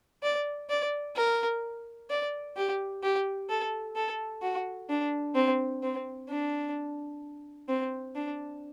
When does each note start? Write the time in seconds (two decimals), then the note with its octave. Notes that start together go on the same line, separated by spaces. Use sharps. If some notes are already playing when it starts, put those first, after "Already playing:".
0.23 D5
0.70 D5
1.16 A#4
2.10 D5
2.57 G4
3.03 G4
3.49 A4
3.96 A4
4.43 F#4
4.90 D4
5.35 C4
5.83 C4
6.29 D4
7.69 C4
8.15 D4